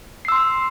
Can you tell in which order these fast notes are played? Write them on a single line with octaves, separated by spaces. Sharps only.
C7 E6 C6